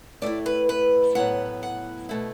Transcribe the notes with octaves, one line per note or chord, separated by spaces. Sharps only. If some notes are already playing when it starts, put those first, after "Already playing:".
A2 A3 E4 D5
B4
B4
A2 F#3 B3 E4 F#5
F#5
B2 A3 E4